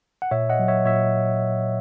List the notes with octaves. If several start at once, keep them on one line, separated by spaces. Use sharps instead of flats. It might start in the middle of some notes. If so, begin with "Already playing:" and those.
F#5
A#2 C#5 E5
D#5 F#5
F#3
C#5 E5
A#2 C#5 E5